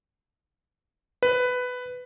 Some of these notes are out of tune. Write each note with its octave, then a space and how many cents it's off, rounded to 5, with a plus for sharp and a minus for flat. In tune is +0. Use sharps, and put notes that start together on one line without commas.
B4 +10